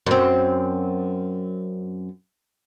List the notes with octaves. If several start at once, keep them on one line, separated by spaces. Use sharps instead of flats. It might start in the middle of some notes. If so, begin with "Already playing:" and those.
F#2 C4